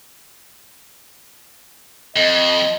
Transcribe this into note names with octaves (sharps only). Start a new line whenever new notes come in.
F2 D#5